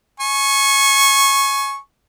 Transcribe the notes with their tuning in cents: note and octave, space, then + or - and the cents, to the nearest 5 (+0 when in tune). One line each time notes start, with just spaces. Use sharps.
G#5 +20 C#6 -15